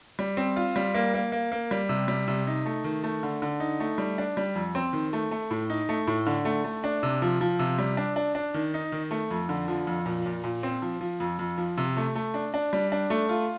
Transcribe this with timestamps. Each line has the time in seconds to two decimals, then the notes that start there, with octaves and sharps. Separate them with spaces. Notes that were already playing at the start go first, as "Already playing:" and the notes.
0.19 G3
0.37 C4
0.56 F4
0.76 G3
0.94 A#3
1.14 A#3
1.32 A#3
1.52 A#3
1.71 G3
1.89 C3
2.08 G3
2.28 C3
2.47 D#4
2.66 A3
2.84 D#3
3.04 A3
3.23 D3
3.42 D3
3.60 D#4
3.80 A3
3.98 G3
4.18 D4
4.37 G3
4.55 F2
4.75 C4
4.93 D#3
5.13 A3
5.31 A3
5.51 A2
5.70 D#4
5.89 A3
6.07 A2
6.26 D3
6.45 A3
6.64 A3
6.84 D4
7.03 C3
7.22 F3
7.41 F3
7.59 C3
7.79 G3
7.97 D4
8.16 D4
8.35 D4
8.54 D#3
8.74 D#4
8.92 D#3
9.11 A3
9.31 F2
9.49 D3
9.68 F3
9.87 F2
10.06 A#2
10.26 A#2
10.44 A#2
10.63 C4
10.82 F3
11.01 F3
11.20 F2
11.39 F2
11.58 F3
11.78 C3
11.97 A3
12.15 A3
12.34 D4
12.54 D4
12.73 G3
12.92 D4
13.10 A3
13.29 F4